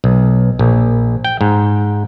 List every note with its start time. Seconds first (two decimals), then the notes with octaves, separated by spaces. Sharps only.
0.04 B1
0.59 A#1
1.25 G5
1.41 G#2